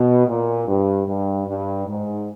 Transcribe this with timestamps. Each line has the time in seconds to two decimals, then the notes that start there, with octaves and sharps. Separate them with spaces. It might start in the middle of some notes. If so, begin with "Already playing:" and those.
Already playing: B2
0.27 A#2
0.68 G2
1.07 G2
1.47 G2
1.87 G#2